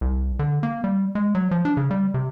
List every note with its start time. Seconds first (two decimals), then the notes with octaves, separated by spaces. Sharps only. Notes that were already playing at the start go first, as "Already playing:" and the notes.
0.01 C2
0.39 D3
0.63 A#3
0.84 G3
1.15 G#3
1.35 F#3
1.51 F3
1.65 D4
1.77 C#3
1.91 G3
2.14 C3